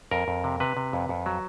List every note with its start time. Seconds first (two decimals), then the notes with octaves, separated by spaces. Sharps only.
0.11 F2 A#4
0.28 F2
0.44 C3
0.60 C3 B4
0.77 C3
0.93 F2
1.09 F2
1.26 F#3